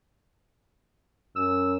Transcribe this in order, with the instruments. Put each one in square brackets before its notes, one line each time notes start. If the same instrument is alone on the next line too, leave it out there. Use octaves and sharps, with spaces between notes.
[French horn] F#2 [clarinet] E6